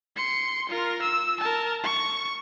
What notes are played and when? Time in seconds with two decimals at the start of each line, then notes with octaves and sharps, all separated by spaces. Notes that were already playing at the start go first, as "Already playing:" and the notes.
0.16 C6 C#7
0.69 F4 A#4
1.02 E6
1.40 A#4 A5
1.84 C#6